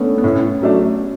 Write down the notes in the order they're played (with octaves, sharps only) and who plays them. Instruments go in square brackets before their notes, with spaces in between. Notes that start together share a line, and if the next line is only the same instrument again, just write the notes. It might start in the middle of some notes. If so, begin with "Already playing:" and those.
Already playing: [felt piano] A3 B3 C#4 D4
B3
[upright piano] A2 [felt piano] C#4
[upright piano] F#3 A3 D4